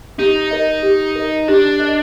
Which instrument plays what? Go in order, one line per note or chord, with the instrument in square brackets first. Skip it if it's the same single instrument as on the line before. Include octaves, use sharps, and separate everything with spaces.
[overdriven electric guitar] D#4 [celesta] G4
[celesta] A#4 D#5
G4
A#4 D#5
[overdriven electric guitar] D4 [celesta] G4
[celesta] A#4 D#5